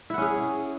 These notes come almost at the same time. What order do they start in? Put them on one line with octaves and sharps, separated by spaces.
E4 F#5 C#4 G#4